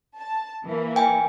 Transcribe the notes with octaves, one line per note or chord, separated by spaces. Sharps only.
A5
E3 A#3
G5 G#5